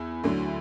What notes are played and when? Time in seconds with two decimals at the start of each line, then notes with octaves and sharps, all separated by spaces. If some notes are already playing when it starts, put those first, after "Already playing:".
Already playing: E2 E4
0.24 D2 D3 F#3